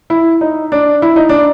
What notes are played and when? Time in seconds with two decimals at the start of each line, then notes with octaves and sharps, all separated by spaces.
0.10 E4
0.41 D#4
0.72 D4
1.02 E4
1.16 D#4
1.29 D4